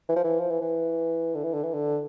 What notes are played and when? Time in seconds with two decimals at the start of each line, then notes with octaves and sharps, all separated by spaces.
0.09 E3
0.16 F3
0.24 E3
0.40 F3
0.50 E3
0.61 E3
1.35 D3
1.44 E3
1.53 D3
1.63 E3
1.73 D3